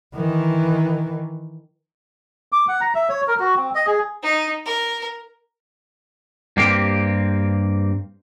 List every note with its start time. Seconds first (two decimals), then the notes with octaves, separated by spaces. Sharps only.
0.15 D#3 E3
2.52 D6
2.68 F#5
2.81 A#5
2.95 E5
3.09 C#5
3.27 A#4
3.40 F#4
3.57 C4
3.75 D#5
3.87 G#4
4.23 D#4
4.65 A#4
6.57 G2 A#3 C4 G4